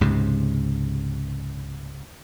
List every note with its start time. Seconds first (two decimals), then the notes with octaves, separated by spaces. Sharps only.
0.01 C#2 G#2 C3